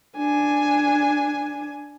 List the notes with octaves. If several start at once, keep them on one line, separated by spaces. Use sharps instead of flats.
D4 G#5